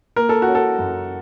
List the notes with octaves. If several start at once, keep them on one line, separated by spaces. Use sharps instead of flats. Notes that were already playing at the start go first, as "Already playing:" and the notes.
A#3 A#4
A4
F#4
C#4
A4
F#2